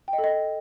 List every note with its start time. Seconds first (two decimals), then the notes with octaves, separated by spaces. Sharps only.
0.08 G5
0.13 D#5
0.18 A4
0.24 D#5